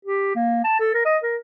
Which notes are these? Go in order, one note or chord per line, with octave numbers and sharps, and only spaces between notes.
G4
A#3
A5
A4
A#4
D#5
A#4